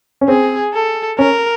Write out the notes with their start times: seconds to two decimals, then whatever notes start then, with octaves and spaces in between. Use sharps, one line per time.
0.21 C#4
0.28 C4 G#4
0.73 A4
1.19 C#4 A#4